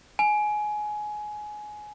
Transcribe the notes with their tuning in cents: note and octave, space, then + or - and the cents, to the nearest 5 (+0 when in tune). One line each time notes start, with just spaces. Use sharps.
G#5 +20